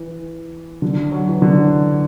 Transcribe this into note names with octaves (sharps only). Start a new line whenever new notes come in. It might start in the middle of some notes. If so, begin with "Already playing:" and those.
Already playing: E3
D3
F#3
E3
D3